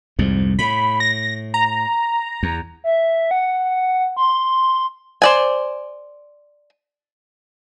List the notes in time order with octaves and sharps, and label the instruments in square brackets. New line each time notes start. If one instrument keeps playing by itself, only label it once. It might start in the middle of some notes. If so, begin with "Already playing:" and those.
[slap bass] C2 F2 G#2
[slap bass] A2 [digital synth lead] B5
[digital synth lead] A#6
A#5
[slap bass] E2
[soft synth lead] E5
F#5
C6
[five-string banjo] C5 D5 G#5